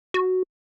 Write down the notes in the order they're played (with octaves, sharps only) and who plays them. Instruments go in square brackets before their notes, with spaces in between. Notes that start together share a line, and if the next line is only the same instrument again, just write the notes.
[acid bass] F#4